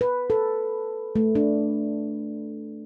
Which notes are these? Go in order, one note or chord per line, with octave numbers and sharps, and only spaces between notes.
B4
A4
A3
D4